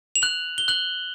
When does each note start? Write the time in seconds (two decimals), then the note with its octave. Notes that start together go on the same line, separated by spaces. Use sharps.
0.15 F7
0.22 F#6 F#7
0.58 G7
0.68 F#6 F#7